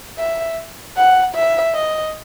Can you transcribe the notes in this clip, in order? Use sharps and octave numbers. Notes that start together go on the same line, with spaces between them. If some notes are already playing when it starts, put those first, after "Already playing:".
E5
F#5
E5
D#5